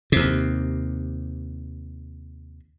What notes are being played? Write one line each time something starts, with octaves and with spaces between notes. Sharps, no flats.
D#2 C3